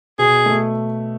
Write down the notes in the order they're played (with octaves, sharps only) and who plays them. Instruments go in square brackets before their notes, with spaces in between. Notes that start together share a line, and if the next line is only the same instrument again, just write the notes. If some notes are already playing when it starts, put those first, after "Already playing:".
[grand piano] B2 [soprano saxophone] G#4
[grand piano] A3